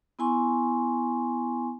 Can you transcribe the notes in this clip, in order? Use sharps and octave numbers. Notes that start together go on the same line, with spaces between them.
B3 E4 G#5 C6 C#6